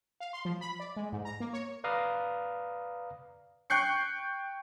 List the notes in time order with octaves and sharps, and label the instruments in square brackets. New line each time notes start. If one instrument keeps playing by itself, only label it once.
[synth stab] F5
C6
F3
B5
D5
G#3
G#2
A#5
A#3
C#5
[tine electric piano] B4 D5 F5 A#5 D#6
[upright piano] G5 C#6 F#6 G6 C7 C#7